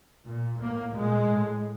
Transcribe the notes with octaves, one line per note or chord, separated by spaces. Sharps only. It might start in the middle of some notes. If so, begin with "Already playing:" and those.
A#2
A2 A#3
A#2 G#3
A2